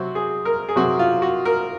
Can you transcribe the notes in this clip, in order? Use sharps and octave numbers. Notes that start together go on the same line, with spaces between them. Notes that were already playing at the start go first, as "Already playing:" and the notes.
Already playing: C3 F#3 C4 F#4
G#4
A#4
G#4
C3 F#3 C4 F#4
F4
F#4
A#4